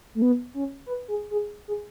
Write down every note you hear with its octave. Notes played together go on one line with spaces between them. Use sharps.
A3
B3
C#4
B4
G#4
G#4
G#4